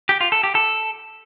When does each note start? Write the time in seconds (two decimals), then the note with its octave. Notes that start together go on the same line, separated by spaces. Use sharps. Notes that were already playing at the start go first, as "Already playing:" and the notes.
0.09 G4
0.21 F4
0.32 A4
0.44 G4
0.55 A4